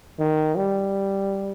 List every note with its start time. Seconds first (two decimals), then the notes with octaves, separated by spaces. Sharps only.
0.19 D#3
0.56 G3